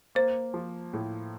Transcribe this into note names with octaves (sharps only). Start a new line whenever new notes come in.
A#3 C5
F3
A2